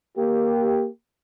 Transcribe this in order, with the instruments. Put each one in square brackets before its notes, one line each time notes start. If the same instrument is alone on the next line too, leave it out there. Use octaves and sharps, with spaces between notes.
[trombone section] A#3 G4